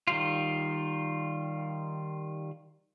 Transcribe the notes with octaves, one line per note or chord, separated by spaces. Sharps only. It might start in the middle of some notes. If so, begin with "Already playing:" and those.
D#3 G3 F4